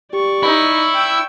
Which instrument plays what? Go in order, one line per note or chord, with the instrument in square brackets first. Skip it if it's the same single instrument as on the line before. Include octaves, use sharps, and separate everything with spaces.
[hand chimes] G4 [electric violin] D5 C#6
[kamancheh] D#4 [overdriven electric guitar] E4 [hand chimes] B5
[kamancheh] G5 E6